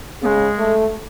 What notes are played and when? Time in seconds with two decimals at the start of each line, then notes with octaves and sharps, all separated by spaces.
0.22 C#3 B3
0.26 G#3
0.59 A3